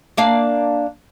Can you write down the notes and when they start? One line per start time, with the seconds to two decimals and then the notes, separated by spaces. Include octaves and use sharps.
0.17 A#3 D4 F5